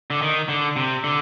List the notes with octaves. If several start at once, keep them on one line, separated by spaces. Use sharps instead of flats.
D3
D#3
D3
C3
D3